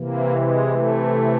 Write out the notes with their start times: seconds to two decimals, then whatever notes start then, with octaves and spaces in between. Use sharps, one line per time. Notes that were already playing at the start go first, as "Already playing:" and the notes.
Already playing: C3 E3 A#3
0.32 G#3
0.70 A3